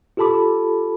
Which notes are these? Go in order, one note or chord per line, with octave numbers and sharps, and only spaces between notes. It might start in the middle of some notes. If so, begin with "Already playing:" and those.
F4 G4 A4 A5 B5 D6